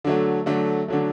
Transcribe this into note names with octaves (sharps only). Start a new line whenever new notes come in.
D3 F#3 A3
D3 F#3 A3
D3 F#3 A3